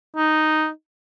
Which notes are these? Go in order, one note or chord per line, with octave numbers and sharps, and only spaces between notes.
D#4